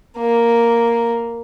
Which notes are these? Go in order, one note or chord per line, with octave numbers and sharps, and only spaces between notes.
A#3